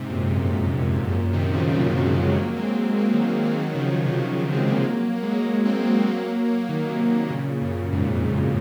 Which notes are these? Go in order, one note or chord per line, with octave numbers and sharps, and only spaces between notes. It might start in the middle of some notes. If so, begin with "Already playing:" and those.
Already playing: G#2 C3
F#2 A#2
F2 G#2
F#2
F2 G#2
F#2 A#2
C3 D#3
C#3 F3
D#3 F#3
F3 G#3
F#3 A#3
G#3 C4
F#3 A#3
D#3 F#3
F#3 A#3
F#3 A#3
D#3 F#3
C#3 F3
C#3 F3
C3 D#3
C#3 F3
D#3 F#3
G#3 C4
F#3 A#3
F#3 A#3
A#3
G#3
F#3 A#3
F#3 A#3
G#3 C4
C4
F#3 A#3
F#3 A#3
F#3 A#3
F#3 A#3
D#3 F#3
C3 D#3
C3 D#3
A#2 C#3
F#2 A#2
F2 G#2
F2